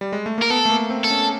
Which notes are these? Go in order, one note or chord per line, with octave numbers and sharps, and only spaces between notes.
G3
G#3
A3
A#3 A#4
B3 A4
A3
A#3
C4
A4
C#4